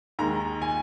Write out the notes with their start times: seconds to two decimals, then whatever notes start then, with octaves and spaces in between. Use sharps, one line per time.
0.19 D#2 D#3 G#3 A#5
0.62 G#5